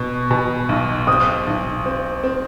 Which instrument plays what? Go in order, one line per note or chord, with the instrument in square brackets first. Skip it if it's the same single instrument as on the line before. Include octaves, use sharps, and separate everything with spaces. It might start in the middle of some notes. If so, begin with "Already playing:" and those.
Already playing: [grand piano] B2
B2
B1
[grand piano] C4 [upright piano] D#6
[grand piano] B1
C4
C4